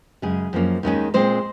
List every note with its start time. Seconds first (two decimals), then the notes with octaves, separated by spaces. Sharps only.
0.22 F#2 C#3 G#3 G#4
0.53 F#2 F3 A#3 C#4
0.83 D#2 D#3 G#3 C#4
1.14 A#2 G#3 C4 C5